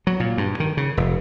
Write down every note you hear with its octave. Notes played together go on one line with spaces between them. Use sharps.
F#3
A#2
G2
D#3
C#3
F1